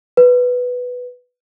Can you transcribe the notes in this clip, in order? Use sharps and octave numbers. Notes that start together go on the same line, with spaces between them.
B4